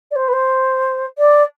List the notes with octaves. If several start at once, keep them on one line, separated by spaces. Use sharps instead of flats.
D5
C5
B4
C5
D5